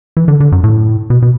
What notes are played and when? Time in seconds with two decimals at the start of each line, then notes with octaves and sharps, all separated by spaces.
0.17 E3
0.28 D3
0.40 D3
0.52 F#2
0.64 A2
1.10 B2
1.22 B2